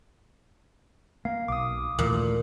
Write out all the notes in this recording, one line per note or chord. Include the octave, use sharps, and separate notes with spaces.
A#3 F5
B1 D6 D#6
D#2 A#2 E3 A3